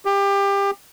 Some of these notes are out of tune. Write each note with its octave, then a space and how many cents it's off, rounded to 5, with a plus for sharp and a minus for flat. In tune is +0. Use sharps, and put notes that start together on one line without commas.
G4 +25